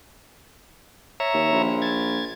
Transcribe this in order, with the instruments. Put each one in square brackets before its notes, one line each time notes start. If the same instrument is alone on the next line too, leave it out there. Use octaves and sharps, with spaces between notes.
[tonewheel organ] C#5 E5 A#5
[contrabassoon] D#2
A#1
[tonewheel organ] G#6 A6